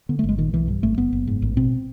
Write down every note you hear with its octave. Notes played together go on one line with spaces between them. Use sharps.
D3 B3
A3
G1
G#3
A#2 D#3
B1 E3
G2
G#1 A3
F#1 B3
F#1
G#2
A1
B2 C4